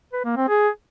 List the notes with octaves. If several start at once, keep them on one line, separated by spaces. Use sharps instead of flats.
B4
A#3
C4
G#4